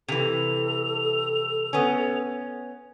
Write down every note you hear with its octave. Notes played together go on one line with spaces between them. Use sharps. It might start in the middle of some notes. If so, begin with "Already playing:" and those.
C3 E3 A4 F7
B3 C#4